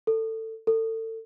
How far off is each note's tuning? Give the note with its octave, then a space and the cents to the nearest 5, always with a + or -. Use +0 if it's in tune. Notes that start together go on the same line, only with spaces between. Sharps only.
A4 +20
A4 +30